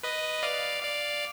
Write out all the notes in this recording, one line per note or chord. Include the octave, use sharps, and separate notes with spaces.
B4 D#5
D5 F5
D5 F5